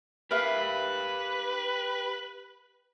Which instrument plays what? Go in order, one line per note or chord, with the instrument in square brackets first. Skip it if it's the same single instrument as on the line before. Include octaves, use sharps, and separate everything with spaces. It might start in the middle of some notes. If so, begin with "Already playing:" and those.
[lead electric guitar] G4 F5 [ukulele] A#4 E5 [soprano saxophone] B4